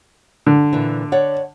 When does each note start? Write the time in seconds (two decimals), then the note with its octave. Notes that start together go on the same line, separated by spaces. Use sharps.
0.47 D3
0.73 A#2 E3
1.12 C#5 D5 F#5